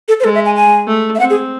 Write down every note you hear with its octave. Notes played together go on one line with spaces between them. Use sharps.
A4
C5
G#3 A4
E5
G#5
G#5
A3
E5
C4 F#5
G#4